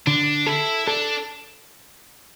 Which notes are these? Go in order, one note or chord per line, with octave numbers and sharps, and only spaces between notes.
D3 D4
E4 A4
D4 A4